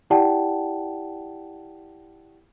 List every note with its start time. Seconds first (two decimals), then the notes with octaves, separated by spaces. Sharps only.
0.10 E4 G4 D5 F#5 G5 A5